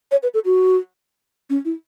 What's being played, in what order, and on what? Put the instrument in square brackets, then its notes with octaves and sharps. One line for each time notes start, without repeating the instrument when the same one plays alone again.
[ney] C#5
B4
A4
F#4
C#4
E4